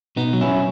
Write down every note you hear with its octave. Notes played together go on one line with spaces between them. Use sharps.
B2 B3 D#4
F#3
C#4 E4
F#3